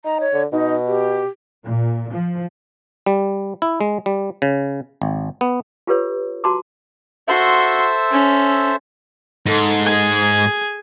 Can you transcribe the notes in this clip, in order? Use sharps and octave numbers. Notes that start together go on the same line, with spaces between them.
D#4 A#5
C#5
D3
B2 D#4
G4
A#2
F3
G3
E4
G#3
G3
C#3
G#1
B3
F4 G4 A4 B4 C#5
F#4 A5 A#5 C6 D6
F#4 A4 C5 E5 C6
C#4
G#2 A4
G#4 G#5